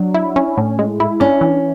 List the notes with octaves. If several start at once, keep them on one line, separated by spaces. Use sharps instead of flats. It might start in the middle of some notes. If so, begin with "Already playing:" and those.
Already playing: F#3 D4
E4
C#4
A2
G#3
E4
C#4 D4
E3